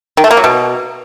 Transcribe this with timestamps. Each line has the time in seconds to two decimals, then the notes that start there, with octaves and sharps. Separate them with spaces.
0.17 D#3
0.24 A3
0.31 A#3
0.37 F#3
0.44 B2